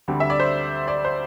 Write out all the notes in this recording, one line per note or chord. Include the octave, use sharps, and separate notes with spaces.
D2 D3 G3 C4
E5
D5
C5
D5
C5